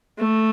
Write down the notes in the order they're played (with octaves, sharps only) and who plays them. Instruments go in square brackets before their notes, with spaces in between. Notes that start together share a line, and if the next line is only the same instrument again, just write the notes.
[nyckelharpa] A3